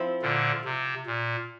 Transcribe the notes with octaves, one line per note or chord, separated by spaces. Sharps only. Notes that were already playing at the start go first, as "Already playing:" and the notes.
Already playing: F3 C4 E4
A#2 D3
C3
A#2